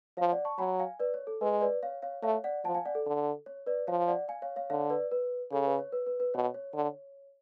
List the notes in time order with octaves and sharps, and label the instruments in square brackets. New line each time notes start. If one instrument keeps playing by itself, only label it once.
[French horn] F3 [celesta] C#5 F5
[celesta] D5 F#5
A5 C#6
[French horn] F#3 [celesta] G#5 B5
[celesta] F5 G#5
B4 D5
C#5
A4
[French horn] G#3 [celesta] B4
[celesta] B4 D5
C#5 F5
C#5 F5
[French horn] A3 [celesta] C#5 F5
[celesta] D5 F#5
[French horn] F3 [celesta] F#5 A5
[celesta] F5 G#5
D5 F#5
A4
[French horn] D3
[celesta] C#5
B4 D5
[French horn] F3 [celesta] C#5 F5
[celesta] D5 F#5
F5 G#5
C#5 F5
C#5 F5
[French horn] D3 [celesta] C#5 F5
[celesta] B4 D5
B4
[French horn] C#3 [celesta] A4
[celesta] B4
C#5
B4
B4
B4
[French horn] B2 [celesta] C#5
[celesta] C#5
[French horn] D3